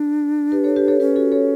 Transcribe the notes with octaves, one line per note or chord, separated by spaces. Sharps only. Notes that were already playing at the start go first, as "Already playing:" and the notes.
Already playing: D4
G4 B4
A4 C#5
G4 B4
A4 C#5
C#4 G4 B4
F#4 A4
A4 C#5